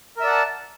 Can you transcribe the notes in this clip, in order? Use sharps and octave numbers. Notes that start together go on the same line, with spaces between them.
A#4 D5 E5 F#5 A5